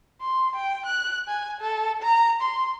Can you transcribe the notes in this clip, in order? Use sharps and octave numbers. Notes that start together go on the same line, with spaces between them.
C6
G5
F#6
G#5
A4
A#5
C6